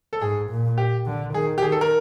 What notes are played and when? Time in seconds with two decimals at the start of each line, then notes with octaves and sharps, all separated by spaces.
0.13 A4
0.21 G#2 G#4
0.50 A#2
0.78 G4
1.06 D3
1.34 D#3 G#4
1.58 G4
1.62 D#3 G#4
1.72 A4
1.81 A#4